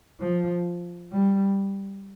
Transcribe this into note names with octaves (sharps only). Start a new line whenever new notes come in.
F3
G3